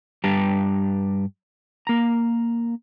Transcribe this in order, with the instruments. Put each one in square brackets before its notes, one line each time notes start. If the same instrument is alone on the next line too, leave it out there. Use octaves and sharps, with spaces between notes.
[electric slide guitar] G2 G3 G4 G5 A5 A#5
A#3 A#5